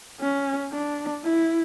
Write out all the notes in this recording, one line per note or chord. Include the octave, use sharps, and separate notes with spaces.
C#4
D4
E4